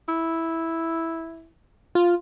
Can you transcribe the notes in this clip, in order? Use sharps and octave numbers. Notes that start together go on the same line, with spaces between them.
E4
F4